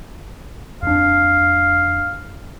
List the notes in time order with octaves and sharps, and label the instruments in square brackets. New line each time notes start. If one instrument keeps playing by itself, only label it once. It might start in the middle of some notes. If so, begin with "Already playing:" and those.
[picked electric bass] F2 D4 [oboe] F5